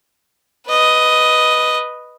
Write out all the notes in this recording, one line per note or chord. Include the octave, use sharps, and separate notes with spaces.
B4 D#5